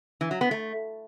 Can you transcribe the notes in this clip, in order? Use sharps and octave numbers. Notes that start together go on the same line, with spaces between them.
E3
F#3
B3
A3